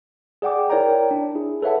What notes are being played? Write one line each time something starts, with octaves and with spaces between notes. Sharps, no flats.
G#4 D5 F#5 G5 D6
E4 A#4 C#5 D5 G5 A#5
D4
E4 G#4
A4 B4 C#5 E5 F#5 A5